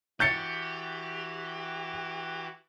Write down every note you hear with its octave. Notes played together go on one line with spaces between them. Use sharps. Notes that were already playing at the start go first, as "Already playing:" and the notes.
E3 F#4 G4 G6 A6 C#7